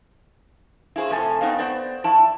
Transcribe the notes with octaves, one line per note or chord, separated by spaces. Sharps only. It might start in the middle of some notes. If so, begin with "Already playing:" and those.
E4 F4 G#4 C5
C3 F3 A3 A4 G#5
B3 C4 D#4 F5
B3 C5 D5
F3 E4 A5